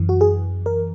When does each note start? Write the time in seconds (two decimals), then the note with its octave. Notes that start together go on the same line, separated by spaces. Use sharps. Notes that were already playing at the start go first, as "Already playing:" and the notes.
Already playing: F#2 E3
0.09 F#4
0.21 G#4
0.66 A#4